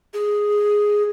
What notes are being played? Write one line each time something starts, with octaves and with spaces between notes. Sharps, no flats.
G#4